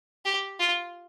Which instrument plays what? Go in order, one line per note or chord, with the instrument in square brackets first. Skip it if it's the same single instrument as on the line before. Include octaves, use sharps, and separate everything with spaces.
[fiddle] G4
F4